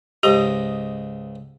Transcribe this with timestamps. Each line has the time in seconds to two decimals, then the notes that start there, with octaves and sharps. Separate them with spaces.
0.23 C#2 G#2 G4 D#5